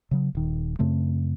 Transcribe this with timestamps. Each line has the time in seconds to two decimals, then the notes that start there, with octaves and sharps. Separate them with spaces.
0.11 C#3 F#3
0.35 D#1 D#3
0.79 F#2 C#3 A3 C4